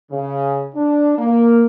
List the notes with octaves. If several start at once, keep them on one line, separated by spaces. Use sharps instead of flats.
C#3
D4
A#3